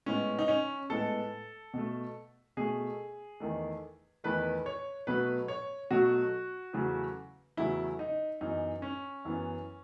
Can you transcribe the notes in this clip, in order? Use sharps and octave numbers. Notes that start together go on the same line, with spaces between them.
A2 G#3 B3 C#4
D#4
C#4
A2 G#3 B3 A4
B2 A3
B2 A3 G#4
E2 D#3 A3
E2 D#3 A3 B4
C#5
B2 F#3 A3 B4
C#5
B2 F#3 A3 F#4
E2 C#3 F#3 A3
E2 C#3 F#3 A3 E4
D#4
F#2 E3 B3 D#4
C#4
F#2 E3 B3